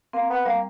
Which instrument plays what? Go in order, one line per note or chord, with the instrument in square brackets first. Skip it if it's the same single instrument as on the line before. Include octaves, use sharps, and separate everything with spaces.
[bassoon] A#3 [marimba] C4
[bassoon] B3
[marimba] G3 [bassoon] A#3